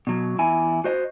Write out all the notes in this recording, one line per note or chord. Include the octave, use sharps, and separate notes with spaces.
B2 F#3
E2 E4 G#5
F#4 C5 D#5